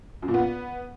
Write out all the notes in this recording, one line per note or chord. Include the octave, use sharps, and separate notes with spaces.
F#2
A#2
B3